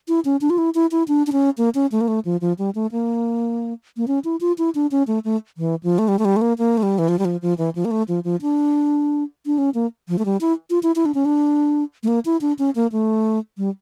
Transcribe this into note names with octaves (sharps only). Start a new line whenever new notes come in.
E4
C#4
D4
F4
E4
E4
E4
D4
D4
C#4
A#3
C#4
A3
A#3
A3
F3
F3
G3
A3
A#3
A#3
C#4
E4
F4
E4
D4
C#4
A3
A3
E3
F3
A3
G3
A3
G3
A3
A#3
A#3
A3
G3
E3
F3
G3
F3
F3
E3
F3
A#3
A3
F3
F3
D4
D4
C#4
A#3
F3
A3
G3
E4
F4
E4
E4
D4
C#4
D4
A3
A#3
E4
D4
C#4
A#3
A3
G3